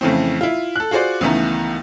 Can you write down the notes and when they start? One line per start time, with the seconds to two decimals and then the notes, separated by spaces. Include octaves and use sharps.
0.01 F2 C#3 E3 A3 C4
0.41 E4 F4
0.76 A4 F#6
0.91 F4 F#4 G#4 C5 D5
1.21 C#2 D#3 E3 A3 B3 A#5